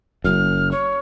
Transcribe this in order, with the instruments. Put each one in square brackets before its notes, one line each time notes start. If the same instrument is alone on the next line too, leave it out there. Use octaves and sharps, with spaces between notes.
[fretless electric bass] F#1 F#2 [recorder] F6
[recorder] C#5